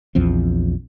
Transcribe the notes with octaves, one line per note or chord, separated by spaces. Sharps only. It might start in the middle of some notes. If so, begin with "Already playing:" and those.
A#1 E2 F3 C4